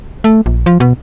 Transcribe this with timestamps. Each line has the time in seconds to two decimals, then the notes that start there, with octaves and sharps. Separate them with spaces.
0.24 A3
0.46 A#1
0.66 F3
0.80 B2